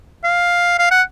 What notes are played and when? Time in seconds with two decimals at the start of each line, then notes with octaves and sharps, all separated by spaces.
0.24 F5
0.79 F5
0.91 F#5